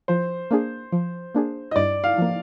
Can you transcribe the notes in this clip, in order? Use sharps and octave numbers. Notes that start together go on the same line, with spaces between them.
F3 C5
A#3 D4 G#4
F3
A#3 D4 G#4
D#5
G2 D5
F5
F3 A#3